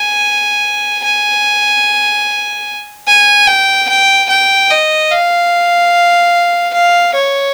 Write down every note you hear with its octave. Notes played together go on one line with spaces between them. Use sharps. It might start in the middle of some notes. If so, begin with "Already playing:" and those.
Already playing: G#5
G#5
G#5
G5
G5
G5
D#5
F5
F5
C#5